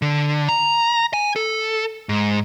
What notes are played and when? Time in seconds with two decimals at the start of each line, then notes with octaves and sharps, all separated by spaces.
0.02 D3
0.49 A#5
1.14 G#5
1.36 A4
2.09 G#2